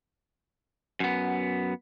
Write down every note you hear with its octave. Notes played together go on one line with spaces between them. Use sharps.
F#2 B3